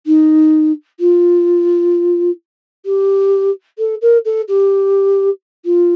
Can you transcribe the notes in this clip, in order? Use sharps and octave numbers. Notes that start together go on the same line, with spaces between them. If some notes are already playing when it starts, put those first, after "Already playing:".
D#4
F4
G4
A4
A#4
A4
G4
F4